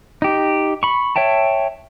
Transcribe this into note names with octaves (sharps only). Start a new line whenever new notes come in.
D#4 G4
B5 C#6
C#5 E5 G5 A5